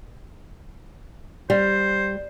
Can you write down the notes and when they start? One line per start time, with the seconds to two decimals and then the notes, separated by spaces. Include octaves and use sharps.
1.50 G3 C5